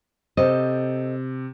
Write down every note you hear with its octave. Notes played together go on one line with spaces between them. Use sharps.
C3 A4 C5 D#5